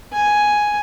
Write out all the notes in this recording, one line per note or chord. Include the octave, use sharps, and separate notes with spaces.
G#5